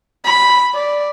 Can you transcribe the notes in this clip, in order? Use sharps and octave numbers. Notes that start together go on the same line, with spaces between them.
B5
D5